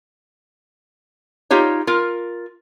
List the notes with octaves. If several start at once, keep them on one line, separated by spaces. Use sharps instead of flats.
D#4 F4 G4 C#5
F4 A#4